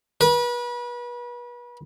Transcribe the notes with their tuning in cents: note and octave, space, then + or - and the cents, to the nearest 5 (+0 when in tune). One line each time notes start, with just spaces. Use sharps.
B4 -35